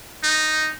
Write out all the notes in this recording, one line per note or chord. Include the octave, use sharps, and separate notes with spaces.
D#4